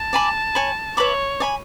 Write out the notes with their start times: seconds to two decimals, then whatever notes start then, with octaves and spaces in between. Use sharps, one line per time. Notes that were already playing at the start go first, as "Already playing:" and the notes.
Already playing: A5
0.13 D5 G#5 B5
0.55 C#5 G#5 B5
0.97 B4 C#5 E5 B5 D6
1.40 D5 G#5 B5